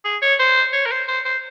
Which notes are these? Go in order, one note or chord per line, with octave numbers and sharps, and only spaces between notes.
G#4
C#5
C5
C#5
A#4
C5
C5
C5